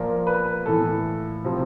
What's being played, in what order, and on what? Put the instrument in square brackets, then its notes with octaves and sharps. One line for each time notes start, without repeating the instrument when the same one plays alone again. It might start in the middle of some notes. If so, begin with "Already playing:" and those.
Already playing: [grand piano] A#2 F3 A#4
B4
A2 E3 A4
C3 F3